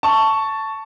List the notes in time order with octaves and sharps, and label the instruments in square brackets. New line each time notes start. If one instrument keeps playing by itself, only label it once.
[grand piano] A5 C#6